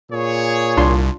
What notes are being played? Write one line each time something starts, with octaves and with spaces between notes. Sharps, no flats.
A#2 G#4 C#5
C2 D4 F4 C6